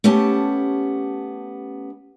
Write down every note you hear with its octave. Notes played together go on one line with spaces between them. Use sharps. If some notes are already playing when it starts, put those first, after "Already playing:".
A3 B3 C#4 G4 A5